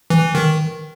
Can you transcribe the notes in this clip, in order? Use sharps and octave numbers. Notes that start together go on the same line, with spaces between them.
E3
D#3